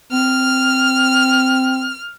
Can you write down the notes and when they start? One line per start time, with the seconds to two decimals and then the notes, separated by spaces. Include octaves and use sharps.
0.12 C4 F6